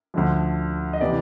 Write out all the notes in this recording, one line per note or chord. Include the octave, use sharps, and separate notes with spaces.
D2 D3 F3
D#5
C3 E3 D5